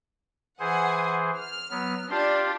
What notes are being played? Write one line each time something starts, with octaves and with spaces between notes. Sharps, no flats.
E3 G#4 C5 F#5 G#5
F6
F#3 B3
D4 F4 G4 C6